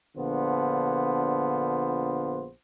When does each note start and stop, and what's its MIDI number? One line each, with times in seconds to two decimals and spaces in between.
0.17 2.47 34
0.17 2.47 50
0.17 2.47 59
0.17 2.47 65
0.17 2.47 72